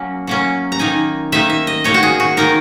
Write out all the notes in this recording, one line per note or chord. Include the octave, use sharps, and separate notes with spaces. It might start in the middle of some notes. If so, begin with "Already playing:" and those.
Already playing: F#3 A#3 C#4
F#3 A#3 C#4
A#5
D#3 A#3 D#4 G#5
D#3 A#3 D#4 E5
E5
D#5
D#3 A#3 D#4 C#5
F#4
G#4
F#4
D#3 A#3 D#4 A#4